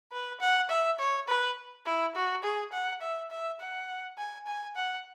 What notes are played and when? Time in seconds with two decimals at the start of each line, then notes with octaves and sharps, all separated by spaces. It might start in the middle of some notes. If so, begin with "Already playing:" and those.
0.12 B4
0.40 F#5
0.69 E5
0.99 C#5
1.28 B4
1.85 E4
2.15 F#4
2.43 G#4
2.72 F#5
3.01 E5
3.31 E5
3.59 F#5
4.17 G#5
4.46 G#5
4.75 F#5